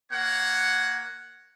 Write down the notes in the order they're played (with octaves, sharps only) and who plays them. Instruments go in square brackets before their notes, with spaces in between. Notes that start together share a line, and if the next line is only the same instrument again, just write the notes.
[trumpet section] A#3 C#5 F#5